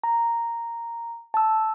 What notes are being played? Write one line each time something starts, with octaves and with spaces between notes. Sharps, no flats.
A#5
A5 E6